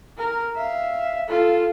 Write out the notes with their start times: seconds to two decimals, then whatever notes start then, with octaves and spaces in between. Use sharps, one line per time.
0.18 A#4
0.56 E5 F5
1.28 F4 A4